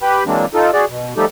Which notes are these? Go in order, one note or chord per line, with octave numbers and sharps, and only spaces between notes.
G4 B4 G5 B5
E3 F#3 G#3 A#3 C4 D4
D#4 F4 A4
F#4 G#4 D5
B2
F3 G3 A3 D#4 G4 A4